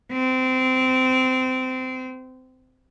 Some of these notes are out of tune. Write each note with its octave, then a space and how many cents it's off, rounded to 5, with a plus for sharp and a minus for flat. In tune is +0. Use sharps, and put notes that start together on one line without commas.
C4 -20